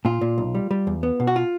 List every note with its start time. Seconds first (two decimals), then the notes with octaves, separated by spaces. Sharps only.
0.05 A#2 F4
0.21 A#2
0.38 B1
0.55 G3
0.71 G3
0.87 E2
1.03 B3
1.20 B2
1.27 F#4
1.36 F4